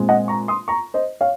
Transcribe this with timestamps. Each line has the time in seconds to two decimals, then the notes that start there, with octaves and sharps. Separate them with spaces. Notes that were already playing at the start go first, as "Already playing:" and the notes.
Already playing: A#2 G#3 C4
0.09 D#5 F#5
0.28 A#5 C#6
0.48 C6 D#6
0.68 A#5 C#6
0.94 C5 D#5
1.21 C#5 F5